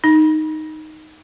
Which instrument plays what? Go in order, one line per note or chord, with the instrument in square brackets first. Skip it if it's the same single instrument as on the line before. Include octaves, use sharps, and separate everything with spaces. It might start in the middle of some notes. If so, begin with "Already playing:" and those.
[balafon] D#4